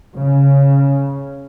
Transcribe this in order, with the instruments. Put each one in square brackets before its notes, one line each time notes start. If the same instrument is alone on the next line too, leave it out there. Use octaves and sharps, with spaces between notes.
[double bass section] C#3